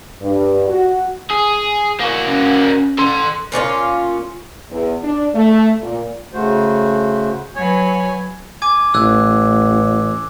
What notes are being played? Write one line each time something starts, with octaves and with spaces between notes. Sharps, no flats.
G2
F#4
G#4
A#3 F#4
C#4
A4 C6
A#2 C#4 D4 F4
E2
D4
A3
A#2
C#3 A3 F#4 C5
F#3 B4 C#5 G#5
G#5 D6 G#6
A1 E6 F#6 G#6